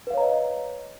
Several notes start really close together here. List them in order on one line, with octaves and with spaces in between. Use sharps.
B4 F5 C#5 A#5 D#5